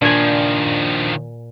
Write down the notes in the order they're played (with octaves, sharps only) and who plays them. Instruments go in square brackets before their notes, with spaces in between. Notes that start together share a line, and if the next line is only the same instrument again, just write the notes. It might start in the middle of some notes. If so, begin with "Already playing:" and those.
[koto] A#2 G#5 [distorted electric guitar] D#3 F3 [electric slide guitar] D4